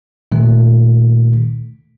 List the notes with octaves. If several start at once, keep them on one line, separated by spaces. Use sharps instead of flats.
A#2 D#3 A3